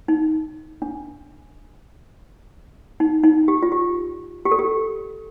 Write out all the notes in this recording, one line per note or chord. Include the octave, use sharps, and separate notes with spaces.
D#4
D4
D#4
D#4
G4
F4
G4
G4
A4
G4